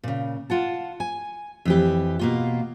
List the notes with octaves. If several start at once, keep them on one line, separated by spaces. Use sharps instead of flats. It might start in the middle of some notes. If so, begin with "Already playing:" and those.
A#2 C#3
F4 F#5 A5
G#5
F2 E3 G4
B2 A#3 F4